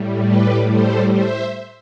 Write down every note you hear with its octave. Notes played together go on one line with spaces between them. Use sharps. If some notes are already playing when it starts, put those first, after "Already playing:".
Already playing: A2 G3
G4 B4
A4 C5
C5 E5